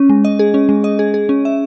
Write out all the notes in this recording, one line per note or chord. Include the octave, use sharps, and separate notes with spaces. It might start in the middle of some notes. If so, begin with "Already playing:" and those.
Already playing: C#4
G#3
D#5
G#4
C#4
G#3
D#5
G#4
G#4
C#4
E5